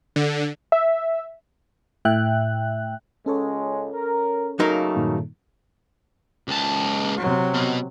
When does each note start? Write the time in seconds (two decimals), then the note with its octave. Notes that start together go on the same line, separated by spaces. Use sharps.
0.16 D3
0.72 E5
2.05 A2 E5 G5 F#6
3.26 C#2 G#3 C#4 A4 C#5
3.94 A#4
4.60 C#3 F#3 A3 A#3 D#4 A#4
4.96 G2 A#2 D#3
6.48 C#2 A5
7.18 C3 F#3
7.54 B2